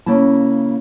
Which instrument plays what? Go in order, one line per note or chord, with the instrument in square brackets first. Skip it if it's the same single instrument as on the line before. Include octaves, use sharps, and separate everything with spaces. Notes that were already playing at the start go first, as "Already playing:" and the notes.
[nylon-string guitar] C#3 A#3 E4 A5